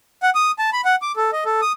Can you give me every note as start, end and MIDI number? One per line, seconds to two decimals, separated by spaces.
0.23 0.30 78
0.35 0.51 87
0.59 0.70 81
0.73 0.81 83
0.85 0.96 78
1.02 1.12 86
1.16 1.30 69
1.33 1.44 75
1.45 1.61 69
1.62 1.72 87